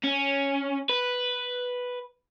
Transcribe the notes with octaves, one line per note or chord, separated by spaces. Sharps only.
C#4
B4